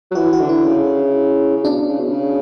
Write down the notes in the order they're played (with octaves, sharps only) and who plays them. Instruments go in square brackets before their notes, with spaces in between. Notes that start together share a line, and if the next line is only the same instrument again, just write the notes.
[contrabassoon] F#3
[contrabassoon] E3 [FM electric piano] F#4
[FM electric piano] F#4
[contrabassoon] D3
[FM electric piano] E4
[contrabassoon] C#3
C#3
[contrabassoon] B2 [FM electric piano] D4
[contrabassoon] C#3
B2
C#3